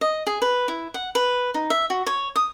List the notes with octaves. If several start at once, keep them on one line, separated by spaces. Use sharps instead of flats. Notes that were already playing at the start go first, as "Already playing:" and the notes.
D#5
G#4
B4
E4
F#5
B4
D#4
E5
F#4
C#5
D#6